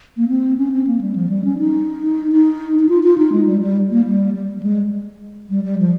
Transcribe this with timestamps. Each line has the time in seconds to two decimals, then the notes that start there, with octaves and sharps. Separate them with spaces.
0.17 A#3
0.28 C4
0.58 C#4
0.72 C4
0.87 A#3
1.01 G3
1.15 F3
1.29 G3
1.44 C#4
1.59 D#4
2.32 D#4
2.79 D#4
2.89 F4
3.03 F4
3.18 D#4
3.32 G#3
3.46 G3
3.61 G3
3.90 A#3
4.05 G3
4.34 G3
4.59 G3
4.63 G#3
5.50 G3
5.64 G3
5.78 F3